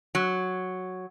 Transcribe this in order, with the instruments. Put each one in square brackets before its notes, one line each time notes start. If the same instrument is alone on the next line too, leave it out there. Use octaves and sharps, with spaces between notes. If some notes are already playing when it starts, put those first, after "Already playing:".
[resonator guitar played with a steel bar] F#3